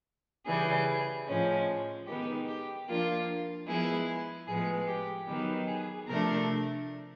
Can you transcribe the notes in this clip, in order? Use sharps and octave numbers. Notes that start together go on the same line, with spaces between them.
C#3 E3 G3 G#4
A2 F3 G#3 C#4
D#3 G#3 B3 D#4 G4
G4
F3 A#3 D4 F4
F3 G#3 B3 E4 G#4
A2 F3 G#3 B3 G#4
G4
D#3 F#3 B3 D#4 G4
G#4
C3 F3 A3 D4 A#4